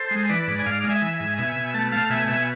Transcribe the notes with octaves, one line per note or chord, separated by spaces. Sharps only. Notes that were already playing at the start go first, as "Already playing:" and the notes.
Already playing: A4 C5
G#3
E3 B4 D5
G#2
G#5
G#2 D5 F5
G#3
E5 G#5
E3
E5 G#5
G#2
B2 E5 G#5
B2
A3 A5
A3 F5 A5
B2 E5 G#5
B2 E5 G#5